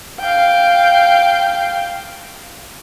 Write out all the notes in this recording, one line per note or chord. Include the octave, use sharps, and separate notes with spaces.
F5 G5